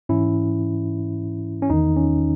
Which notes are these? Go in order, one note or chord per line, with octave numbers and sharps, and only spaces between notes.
G#2 E3 C#4 E4
C#4
E2 D#3 D#4
C#4